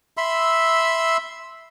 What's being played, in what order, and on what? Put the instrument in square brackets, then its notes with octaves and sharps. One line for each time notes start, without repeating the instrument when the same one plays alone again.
[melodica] E5 B5 C6 E6